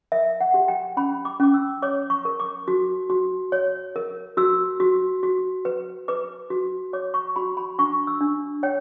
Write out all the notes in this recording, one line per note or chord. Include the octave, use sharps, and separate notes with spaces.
A#4 E5
F#5
G4
G5
C#4 B5
D6
C#4 D6
E6
C#5 D6
C#6
A#4
D6
F#4
F#4
C#5
A#4
F#4 E6
F#4
F#4
B4
B4 D6
F#4
C#5 D6
C#6
F#4 B5
B5
D4 C#6
E6
D4
C#5 G5